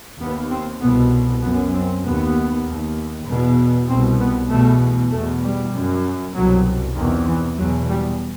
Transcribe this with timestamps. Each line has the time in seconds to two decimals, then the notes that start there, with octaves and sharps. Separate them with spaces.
0.20 D#2 B3
0.51 C4
0.81 C2 B2 B3
1.42 F#2 B3
1.74 C4
2.05 D#2 B3
2.66 D#2
3.27 E2 B2
3.88 C2 B2 C4
4.19 B3
4.50 E2 B2 A3
5.11 E2 B2 A3
5.42 G3
5.73 F#2
6.34 C2 B2 F#3
6.96 E2 C3 D#3
7.27 E3
7.58 E2 B2 F#3
7.89 G3